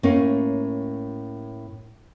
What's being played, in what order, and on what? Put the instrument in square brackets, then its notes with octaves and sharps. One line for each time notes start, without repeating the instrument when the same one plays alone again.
[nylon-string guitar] A2 A#3 C#4